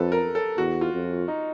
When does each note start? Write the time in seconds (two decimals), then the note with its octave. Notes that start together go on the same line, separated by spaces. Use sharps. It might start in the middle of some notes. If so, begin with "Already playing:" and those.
Already playing: F2 A4 B4
0.12 A#4
0.35 A4
0.58 E2 F#4
0.81 F4
0.94 F2
1.28 D#4